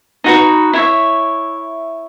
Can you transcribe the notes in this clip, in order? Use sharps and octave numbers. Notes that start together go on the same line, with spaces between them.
D#4 F#4 B4
E4 C#5 E5